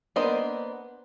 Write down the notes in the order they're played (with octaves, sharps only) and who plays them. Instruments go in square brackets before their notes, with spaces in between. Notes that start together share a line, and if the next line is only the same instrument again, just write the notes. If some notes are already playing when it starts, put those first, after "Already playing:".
[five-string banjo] A#3 B3 D4 C5 D#5